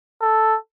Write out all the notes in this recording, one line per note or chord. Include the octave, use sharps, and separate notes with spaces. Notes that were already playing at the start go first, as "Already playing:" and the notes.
A4